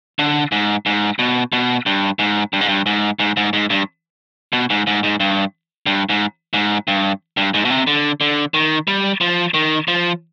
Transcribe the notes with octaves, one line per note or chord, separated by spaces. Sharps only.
D3
G#2
G#2
B2
B2
G2
G#2
G2
G#2
G2
G#2
G#2
G#2
G#2
G2
B2
G#2
G#2
G#2
G2
G2
G#2
G#2
G2
G2
G#2
B2
C3
D3
D3
D#3
G3
F3
D#3
F3